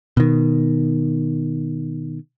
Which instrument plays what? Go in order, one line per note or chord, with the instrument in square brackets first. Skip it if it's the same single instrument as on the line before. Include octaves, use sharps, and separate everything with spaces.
[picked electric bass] B2 D#3